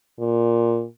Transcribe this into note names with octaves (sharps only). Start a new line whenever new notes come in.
A#2